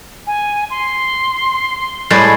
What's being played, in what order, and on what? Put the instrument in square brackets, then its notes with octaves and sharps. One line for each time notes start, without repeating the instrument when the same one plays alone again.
[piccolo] G#5
C6
[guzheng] A2 G3 G#3